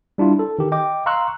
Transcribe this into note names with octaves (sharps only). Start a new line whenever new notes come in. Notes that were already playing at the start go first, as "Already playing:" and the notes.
G3 D4 E4 F4
A4
D#3 G4
D#5 G5 D6
F5 A#5 C6 C#6 E6 F#6